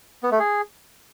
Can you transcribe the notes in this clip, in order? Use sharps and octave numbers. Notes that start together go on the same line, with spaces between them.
B3
A3
G#4